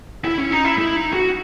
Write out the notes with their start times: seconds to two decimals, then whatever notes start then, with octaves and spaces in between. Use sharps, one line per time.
0.25 E4
0.38 C#4
0.51 D#4
0.64 E4
0.78 E4
0.96 D#4
1.13 F#4